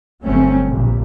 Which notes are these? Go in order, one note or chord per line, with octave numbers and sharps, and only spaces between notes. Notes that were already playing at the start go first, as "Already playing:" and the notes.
G1 F#3 A3 C4 C#4
A#1 G2